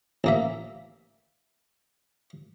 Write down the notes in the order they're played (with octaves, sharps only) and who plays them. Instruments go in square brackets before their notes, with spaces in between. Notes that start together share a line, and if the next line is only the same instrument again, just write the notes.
[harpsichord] A1 A#3 E5